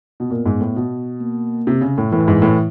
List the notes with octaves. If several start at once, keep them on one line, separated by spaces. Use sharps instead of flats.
B2
A#2 B3
G#2
A2
B2
A#3
C3
C#3
A2
A2 E3
G#2
A2